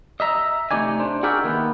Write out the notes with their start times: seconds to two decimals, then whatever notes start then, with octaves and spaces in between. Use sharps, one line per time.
0.20 D#5 E5 A#5
0.71 C3 A3 D#4 D5 G#5
1.00 D4 C5
1.23 F#4 G#4 A#4 D5 E5 G5
1.44 D#3 A#3 B3